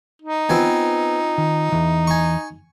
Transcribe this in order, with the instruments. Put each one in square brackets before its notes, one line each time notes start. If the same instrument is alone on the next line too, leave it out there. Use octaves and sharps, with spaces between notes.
[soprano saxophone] D#4
[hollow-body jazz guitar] B3 B4 [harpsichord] C4 F4 G#5
[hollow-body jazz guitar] D#3
E2 E3
[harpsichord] G#5 C#6